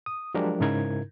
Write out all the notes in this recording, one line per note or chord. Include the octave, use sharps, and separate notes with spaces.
D#6
F3 F#3 G#3 D4 G4 A#4
G#2 C#3 D#4 E4 A#4 G#6